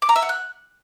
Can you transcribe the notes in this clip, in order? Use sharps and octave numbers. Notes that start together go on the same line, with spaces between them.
D6
A#5
E5
F#5
F#6